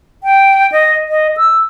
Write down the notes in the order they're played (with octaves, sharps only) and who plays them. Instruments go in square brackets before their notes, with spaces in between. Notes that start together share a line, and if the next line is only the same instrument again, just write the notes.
[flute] G5
D#5
D#5
E6